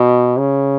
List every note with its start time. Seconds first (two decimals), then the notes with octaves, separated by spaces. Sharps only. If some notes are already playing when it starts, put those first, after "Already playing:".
Already playing: B2
0.39 C#3